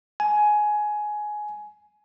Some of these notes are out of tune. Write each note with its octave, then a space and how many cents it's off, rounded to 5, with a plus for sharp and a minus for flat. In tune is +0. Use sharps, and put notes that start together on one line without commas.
G#5 +15